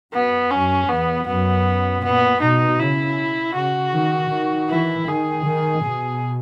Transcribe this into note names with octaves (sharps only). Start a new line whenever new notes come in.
F#2 B3
F#2 C#4
E2 B3
F#2 B3
A#2 B3
B2 D#4
C#3 E4
C#3 F#4
D#3
D#3
E3 E4
D#3 G#4
D#3
B2